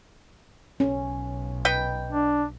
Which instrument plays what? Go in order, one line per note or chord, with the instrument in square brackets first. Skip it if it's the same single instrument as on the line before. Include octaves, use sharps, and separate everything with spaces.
[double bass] B1 [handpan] C#4
[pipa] D#4 B4 G5
[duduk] D4